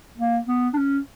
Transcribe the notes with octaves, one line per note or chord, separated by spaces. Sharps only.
A#3
B3
D4
C#4